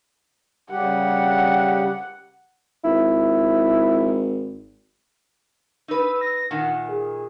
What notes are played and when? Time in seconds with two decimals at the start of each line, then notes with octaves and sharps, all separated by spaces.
0.71 C#3 G3 G4 F#5
2.84 G#1 E4
5.88 D#4 B4 E6
6.21 A#6
6.51 A#2 D#3 F#5
6.89 G#4